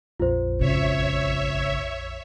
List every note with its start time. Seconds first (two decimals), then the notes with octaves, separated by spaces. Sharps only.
0.20 A#1 F2 F3 F4 C5
0.59 G#1 C#3 C#5 E5